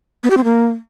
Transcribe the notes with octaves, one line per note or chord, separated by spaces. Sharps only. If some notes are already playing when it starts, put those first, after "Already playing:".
B3
G4
C4
A#3